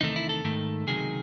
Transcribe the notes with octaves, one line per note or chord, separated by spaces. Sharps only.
E2 C3 D#3 A3 D#4
E4
A4
G#2 D#3 A3
C#2 C3 D#3 F#3 G#4